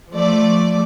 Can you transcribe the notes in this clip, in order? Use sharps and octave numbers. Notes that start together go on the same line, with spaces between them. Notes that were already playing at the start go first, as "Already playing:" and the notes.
F3 A3 D5